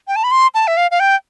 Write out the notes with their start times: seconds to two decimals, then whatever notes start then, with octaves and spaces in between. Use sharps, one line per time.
0.08 G5
0.16 A5
0.24 B5
0.31 C6
0.54 A5
0.67 E5
0.77 F5
0.91 F5
1.00 G5